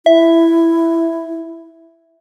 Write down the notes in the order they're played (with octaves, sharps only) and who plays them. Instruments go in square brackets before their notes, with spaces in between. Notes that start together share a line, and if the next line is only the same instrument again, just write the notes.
[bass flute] E4 [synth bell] E5